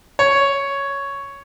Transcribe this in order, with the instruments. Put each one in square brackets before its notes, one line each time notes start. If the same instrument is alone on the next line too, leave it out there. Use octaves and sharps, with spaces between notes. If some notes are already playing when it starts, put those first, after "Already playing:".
[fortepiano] C#5